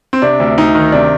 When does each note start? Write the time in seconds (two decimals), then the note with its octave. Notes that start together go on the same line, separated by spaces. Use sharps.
0.13 C4
0.22 C3 D4
0.40 D2
0.58 D2 D#4
0.75 D#3
0.92 C3 D4